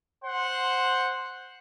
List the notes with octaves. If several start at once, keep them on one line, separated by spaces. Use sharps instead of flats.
C5 F#5 C6